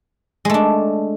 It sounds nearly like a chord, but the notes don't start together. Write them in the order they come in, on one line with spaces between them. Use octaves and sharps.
G#3 A3 D4